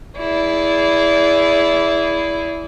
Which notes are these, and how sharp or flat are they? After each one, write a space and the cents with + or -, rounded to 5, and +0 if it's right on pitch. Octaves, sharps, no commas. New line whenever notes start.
E4 +0 G#4 +0 D5 -30